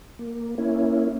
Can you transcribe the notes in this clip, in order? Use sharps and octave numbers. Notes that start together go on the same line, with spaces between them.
A#3
A#3 C#4 E4